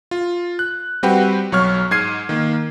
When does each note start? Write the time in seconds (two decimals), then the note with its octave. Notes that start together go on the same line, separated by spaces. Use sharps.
0.11 F4
0.59 F#6
1.03 G3 C4 F#4 G4 B4
1.52 B1 F#3 C#5 C#6 F6
1.91 G#2 G#6 C7 D#7
2.29 D#3 A#3